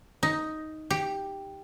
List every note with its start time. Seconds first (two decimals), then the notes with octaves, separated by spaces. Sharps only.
0.23 D#4
0.90 G4